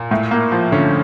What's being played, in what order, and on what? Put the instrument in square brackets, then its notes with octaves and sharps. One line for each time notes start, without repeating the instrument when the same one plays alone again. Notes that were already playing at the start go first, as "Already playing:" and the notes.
Already playing: [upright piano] A#2
[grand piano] A2
A#3
F3
[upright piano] D3 [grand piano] C#4